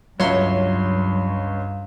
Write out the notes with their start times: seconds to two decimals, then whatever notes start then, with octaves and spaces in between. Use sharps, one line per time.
0.20 C#2 G2 F#3 C#5 E5 C6